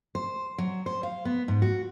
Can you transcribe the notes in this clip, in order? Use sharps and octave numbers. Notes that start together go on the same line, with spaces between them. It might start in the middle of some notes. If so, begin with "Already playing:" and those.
C5
F#3
C5
F5
B3
G#2
F#4